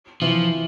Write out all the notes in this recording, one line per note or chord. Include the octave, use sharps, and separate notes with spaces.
E3 F3